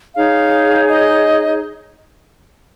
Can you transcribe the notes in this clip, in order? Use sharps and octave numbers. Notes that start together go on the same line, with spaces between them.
D#4 G#4 C#5 F5
D#5